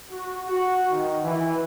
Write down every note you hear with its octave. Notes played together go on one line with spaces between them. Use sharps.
F#4
F#4
D#3
E3